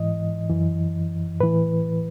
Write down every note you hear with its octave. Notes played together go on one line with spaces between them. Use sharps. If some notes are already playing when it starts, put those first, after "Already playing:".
Already playing: G#2 E3 D#5
F#2 E3
A2 E3 B4